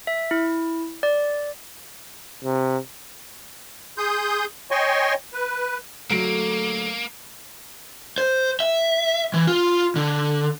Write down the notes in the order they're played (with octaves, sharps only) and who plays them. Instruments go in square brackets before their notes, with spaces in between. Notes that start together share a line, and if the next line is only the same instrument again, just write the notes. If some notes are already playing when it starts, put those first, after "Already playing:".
[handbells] E5
E4
D5
[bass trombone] C3
[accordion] G#4 C6 D#6 G6
C#5 D#5 G5 G#5 C6 C#6
B4
[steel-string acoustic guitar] D2 A3 D5 [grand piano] F#3 D7 [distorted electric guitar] A#3
[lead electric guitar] C5
E5
E3
F4
D3